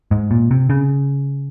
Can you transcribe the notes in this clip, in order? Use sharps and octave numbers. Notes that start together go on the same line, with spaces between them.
G#2
A#2
C3
C#3